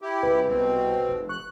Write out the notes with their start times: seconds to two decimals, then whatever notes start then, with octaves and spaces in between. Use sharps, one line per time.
0.02 E4 G4
0.23 C#2 B4
0.48 C2 B2 C4
1.09 F1
1.29 C#6 F#6